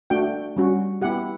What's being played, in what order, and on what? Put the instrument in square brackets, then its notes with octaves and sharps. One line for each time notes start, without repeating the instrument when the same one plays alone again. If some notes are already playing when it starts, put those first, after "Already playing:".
[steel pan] A3 D4 F#4 G5
G3 C#4 F#4
B3 E4 G4 F#5